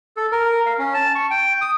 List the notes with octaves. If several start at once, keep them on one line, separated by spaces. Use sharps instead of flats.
A4
A#4
F5
C#4
A5
C#6
G5
D#6